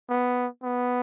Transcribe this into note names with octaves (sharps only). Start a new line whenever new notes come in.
B3
B3